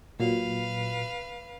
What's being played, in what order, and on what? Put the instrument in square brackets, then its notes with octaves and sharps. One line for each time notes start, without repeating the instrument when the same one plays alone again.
[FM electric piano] A#2 F#3 [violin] B4 F5